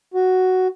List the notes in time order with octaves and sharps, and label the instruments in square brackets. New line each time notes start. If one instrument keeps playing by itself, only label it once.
[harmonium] F#4